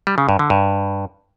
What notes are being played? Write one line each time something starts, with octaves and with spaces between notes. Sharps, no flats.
G3
C#3
G2
D3
G2